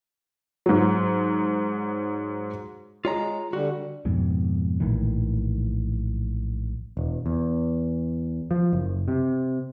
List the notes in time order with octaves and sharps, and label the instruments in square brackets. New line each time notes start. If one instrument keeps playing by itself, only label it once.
[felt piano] G#2 F#3
[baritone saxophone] G#3 [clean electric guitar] F4 C#5 A#5
[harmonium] D3 [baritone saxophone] G3 [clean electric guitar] F#4
[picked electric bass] F2 G#2 B2
A#1 A2 D#3 E3
E1
E2
F3
F#1
C3